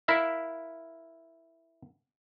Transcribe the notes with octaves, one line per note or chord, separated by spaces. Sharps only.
E4 A#4 E5 F5